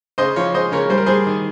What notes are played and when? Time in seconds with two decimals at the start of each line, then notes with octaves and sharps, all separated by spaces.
0.18 C#3 C5 D#5
0.36 F3 C#5 F5
0.54 G#3 C5 D#5
0.72 C#3 A#4 C#5
0.90 G3 C5
0.98 A#4
1.06 G3 G#4 C5
1.27 D#3